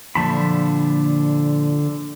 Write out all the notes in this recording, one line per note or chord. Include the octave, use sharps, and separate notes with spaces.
A#2 D3 F3 A5 B5